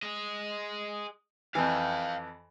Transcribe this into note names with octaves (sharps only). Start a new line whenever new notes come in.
G#4 D#5
F2 E3 F5 G5